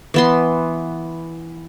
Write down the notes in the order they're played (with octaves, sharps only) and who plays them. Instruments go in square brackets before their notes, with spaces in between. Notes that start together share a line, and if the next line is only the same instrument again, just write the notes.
[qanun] E3 B3 C6